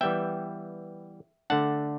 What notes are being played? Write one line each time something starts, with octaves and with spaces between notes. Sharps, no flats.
E3 G3 B3 E5 G5
D3 A3 D4 F#5 A5